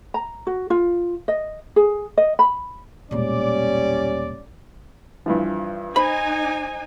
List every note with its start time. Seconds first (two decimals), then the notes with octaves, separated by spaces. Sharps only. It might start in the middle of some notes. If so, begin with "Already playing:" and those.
0.14 A#5
0.47 F#4
0.70 F4
1.28 D#5
1.76 G#4
2.17 D#5
2.39 B5
3.11 E1 A#2 G3 C#4 D5
5.26 G2 E3 F3
5.96 D#4 C5 G#5 B5